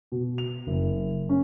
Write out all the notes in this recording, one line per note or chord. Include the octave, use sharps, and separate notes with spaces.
B2
F7
F#1
C#4